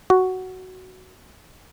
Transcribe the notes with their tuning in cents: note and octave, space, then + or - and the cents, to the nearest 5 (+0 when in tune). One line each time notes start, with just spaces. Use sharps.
F#4 +5